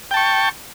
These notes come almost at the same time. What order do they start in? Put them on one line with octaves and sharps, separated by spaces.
G5 A5 C#6